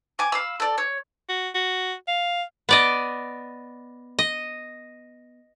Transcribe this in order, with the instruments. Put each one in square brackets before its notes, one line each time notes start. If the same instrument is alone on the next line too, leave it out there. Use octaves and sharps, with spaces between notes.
[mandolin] G#5 D6
F5 B5 E6
A4 D5
C#5
[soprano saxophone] F#4
F#4
F5
[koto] B3 D5 D#5
D#5